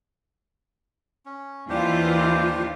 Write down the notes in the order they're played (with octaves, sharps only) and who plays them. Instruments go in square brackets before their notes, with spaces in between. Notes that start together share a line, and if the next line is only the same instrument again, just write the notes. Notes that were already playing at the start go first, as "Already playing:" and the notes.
[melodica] C#4
[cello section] D#2 E3 F4 [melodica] D4 G4 C5